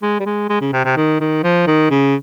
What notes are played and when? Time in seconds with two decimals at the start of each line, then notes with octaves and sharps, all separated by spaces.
0.02 G#3
0.20 G3
0.26 G#3
0.49 G#3
0.61 C#3
0.73 C3
0.85 C3
0.97 D#3
1.20 D#3
1.44 F3
1.67 D#3
1.91 C#3